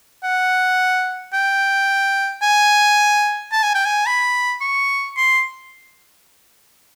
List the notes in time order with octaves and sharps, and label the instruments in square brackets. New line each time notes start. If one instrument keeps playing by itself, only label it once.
[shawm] F#5
G5
G#5
A5
G#5
G5
G#5
B5
C#6
C6